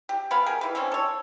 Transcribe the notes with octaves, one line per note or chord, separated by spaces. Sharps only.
G4
G#3 B3 F5 B5
G4 G#4 A#4
E3 B4
D3 G3 C4 C#4
A4 C#5